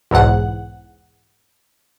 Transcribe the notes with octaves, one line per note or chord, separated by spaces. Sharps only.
B1 E2 G#2 F#5